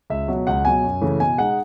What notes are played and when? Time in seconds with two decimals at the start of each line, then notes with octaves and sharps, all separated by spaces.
0.10 C#2 E5
0.28 B2 F#3
0.47 C#2 F#5
0.65 B2 F#3 G#5
0.84 F#2
1.01 C#3 E3 A3
1.20 B2 G#5
1.38 G#3 D#4 F#5